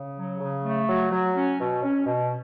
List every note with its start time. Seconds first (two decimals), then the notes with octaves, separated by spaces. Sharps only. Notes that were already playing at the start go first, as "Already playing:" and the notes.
Already playing: C#3
0.17 F#3
0.40 C#3
0.64 A3
0.88 F#3
1.11 F#3
1.35 C#4
1.59 B2
1.82 C#4
2.06 B2